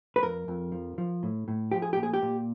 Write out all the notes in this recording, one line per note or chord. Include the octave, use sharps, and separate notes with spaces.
B4
F2 A#4
F2
F3
F3
A2
A2
F3 G4
G#4
A#2 G4
G#4
G4
A#2